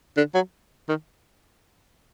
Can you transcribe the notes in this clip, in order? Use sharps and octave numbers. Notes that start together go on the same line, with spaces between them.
D3
F#3
D#3